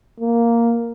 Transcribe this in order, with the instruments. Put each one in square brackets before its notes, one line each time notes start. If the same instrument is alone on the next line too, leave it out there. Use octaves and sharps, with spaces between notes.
[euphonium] A#3